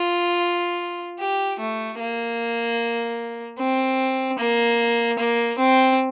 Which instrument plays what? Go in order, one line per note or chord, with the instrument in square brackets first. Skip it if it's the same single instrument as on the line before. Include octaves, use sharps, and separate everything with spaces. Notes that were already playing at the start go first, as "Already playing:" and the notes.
Already playing: [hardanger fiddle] F4
G4
A3
A#3
C4
A#3
A#3
C4